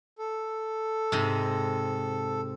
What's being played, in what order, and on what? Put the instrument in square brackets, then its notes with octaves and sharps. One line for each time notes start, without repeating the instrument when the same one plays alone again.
[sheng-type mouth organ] A4
[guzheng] G#2 C3